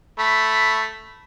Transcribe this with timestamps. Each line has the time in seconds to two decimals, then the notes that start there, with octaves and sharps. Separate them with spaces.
0.19 A3 B5